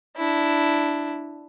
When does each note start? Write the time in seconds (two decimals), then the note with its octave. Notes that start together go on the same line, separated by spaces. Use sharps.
0.17 D4 E4